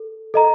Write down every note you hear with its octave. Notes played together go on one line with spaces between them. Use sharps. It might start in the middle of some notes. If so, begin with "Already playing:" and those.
Already playing: A4
A4 D#5 A#5